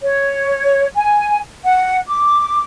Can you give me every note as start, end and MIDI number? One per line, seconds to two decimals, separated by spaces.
0.02 0.87 73
0.96 1.38 80
1.65 1.97 78
2.08 2.64 86